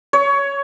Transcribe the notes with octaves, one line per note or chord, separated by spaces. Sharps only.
C#5